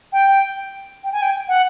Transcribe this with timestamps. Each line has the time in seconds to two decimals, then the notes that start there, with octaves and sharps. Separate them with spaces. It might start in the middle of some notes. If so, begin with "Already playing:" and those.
0.13 G5
1.04 G5
1.12 G#5
1.22 G5
1.48 F#5